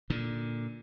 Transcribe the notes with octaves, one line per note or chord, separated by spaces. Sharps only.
A#2 D3